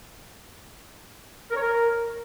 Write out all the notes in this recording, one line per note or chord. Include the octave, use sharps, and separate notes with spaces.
A#4
C#5
A#4